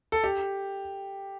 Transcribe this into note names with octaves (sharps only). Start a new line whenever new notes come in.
A4
G4